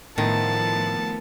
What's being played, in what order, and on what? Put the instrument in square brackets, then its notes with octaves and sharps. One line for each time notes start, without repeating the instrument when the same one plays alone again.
[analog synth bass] A2 [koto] D#3 [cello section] F3 A3 B3 [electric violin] A5